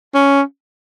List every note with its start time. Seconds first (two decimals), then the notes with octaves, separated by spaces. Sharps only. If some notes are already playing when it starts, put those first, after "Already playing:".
0.15 C#4